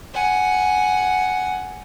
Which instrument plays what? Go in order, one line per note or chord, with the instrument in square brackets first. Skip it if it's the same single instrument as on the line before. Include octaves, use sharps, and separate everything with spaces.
[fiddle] F#5 G#5